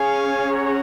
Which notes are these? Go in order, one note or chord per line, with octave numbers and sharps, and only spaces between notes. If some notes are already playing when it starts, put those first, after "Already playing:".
Already playing: C#4 G#4 C#5 F5 G#5
F#5 A#5